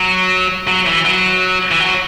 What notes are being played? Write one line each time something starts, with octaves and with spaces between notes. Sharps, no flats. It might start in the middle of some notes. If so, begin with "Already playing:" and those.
Already playing: F#3
F#3
E3
F#3
E3
F#3